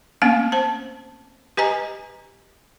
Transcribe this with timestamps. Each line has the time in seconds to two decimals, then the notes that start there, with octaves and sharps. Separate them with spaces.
0.22 A3 A#3 C4 C#4 F5 G#5
0.52 C5 A5
1.57 G4 B4 D#5 G#5 A#5